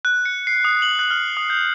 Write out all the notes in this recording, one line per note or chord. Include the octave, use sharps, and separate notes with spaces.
F#6
C#7
C7
D#6
F#7
F#6
F6
D#6
G6